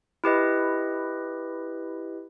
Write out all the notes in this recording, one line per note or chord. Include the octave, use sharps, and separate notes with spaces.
E4 G4 B4 D#5